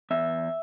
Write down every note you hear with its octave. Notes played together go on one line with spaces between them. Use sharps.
E2 E5